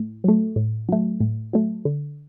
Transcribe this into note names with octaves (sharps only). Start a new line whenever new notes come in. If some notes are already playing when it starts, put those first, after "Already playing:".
Already playing: A2
F#3 A3
A2
F#3 A3
A2
F#3 A3
D3